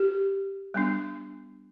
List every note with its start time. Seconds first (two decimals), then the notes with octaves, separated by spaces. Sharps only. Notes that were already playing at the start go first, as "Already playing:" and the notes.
Already playing: G4
0.74 G3 B3 D4